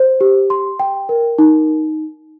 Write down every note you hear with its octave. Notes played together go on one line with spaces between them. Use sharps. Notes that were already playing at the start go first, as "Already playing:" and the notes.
Already playing: C5
G4
C6
G5
A#4
D#4